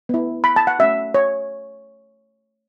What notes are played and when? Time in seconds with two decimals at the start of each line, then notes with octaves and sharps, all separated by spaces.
0.09 B3 E4
0.44 B5
0.56 A5
0.67 F#5
0.79 A3 C#4 F#4 E5
1.14 C#5